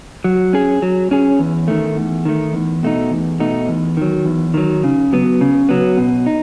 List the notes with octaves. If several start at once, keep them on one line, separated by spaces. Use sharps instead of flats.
F#3
C#4 G#4
F#3
C#4 G#4
E2
D#3 A3
E2
D#3 A3
E2
B2 A3 D#4
E2
B2 A3 D#4
E2
D#3 F#3
E2
D#3 F#3
C#3
F#3 B3
C#3
F#3 B3
B2
D#4